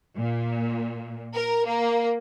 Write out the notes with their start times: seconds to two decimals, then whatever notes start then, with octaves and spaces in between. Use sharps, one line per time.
0.17 A#2
1.34 A#4
1.67 A#3